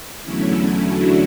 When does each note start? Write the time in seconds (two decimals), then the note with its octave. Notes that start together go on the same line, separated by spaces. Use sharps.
0.21 E2 D3 F#3 A3 C#4 E4
0.52 C#4 E4
0.84 D4 F#4